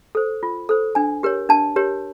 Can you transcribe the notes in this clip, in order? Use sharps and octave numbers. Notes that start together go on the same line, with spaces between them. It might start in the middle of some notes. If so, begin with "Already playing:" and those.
A4 C5
F4
A4 C5
D4 G#5
G4 A#4 C#5
D4 A5
G4 A#4 C#5